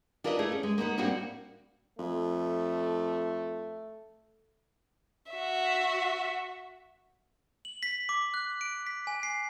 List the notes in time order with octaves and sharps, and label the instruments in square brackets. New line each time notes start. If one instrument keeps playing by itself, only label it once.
[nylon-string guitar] D4 F4 A#4 B4 C#5 D#5
A3 E4 G#4 A#4
C#4
G#3
A#3 B3 D#4 B4
A2 G3 A#3 C4 D4 F#4
[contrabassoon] F2 [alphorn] A3
[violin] F#4 E5
[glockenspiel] F#7
B6
D6
F#6
D7
B6
G#5
C7